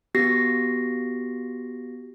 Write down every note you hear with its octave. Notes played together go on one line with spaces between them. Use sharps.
B3 F#4 G4 A#6 C7